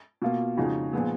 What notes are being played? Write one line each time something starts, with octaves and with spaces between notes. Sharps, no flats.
B2 A#3 F4
F2 C#3 G#3 D#4 F#4
A#2 F3 G#3 B3